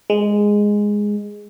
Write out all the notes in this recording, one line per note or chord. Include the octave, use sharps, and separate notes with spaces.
G#3